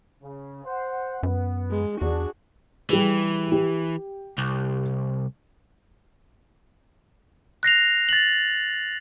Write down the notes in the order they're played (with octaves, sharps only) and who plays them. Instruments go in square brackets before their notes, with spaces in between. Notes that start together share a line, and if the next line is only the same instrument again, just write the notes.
[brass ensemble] C#3
C5 F#5
[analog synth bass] F#2 [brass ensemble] B3
[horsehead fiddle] G#3
[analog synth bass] E2 [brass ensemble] D4 [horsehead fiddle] F#4 G#4
[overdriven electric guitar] E3 [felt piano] G3 G#4
[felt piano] G4
[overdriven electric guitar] C2
[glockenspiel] F#6 A#6 C7 F7
A6 F#7